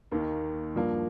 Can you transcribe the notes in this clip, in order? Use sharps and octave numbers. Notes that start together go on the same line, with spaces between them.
D#2 D#3 A#3
G2 F3 A#3